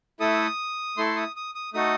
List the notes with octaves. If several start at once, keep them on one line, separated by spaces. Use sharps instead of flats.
A3 E4 A4 D#6
A3 E4 A4 C6
D#6
D#6
D#6
A3 D#4 F#4 A4 D#6